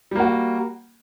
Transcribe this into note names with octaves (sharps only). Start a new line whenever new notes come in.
G3 A#3 F#4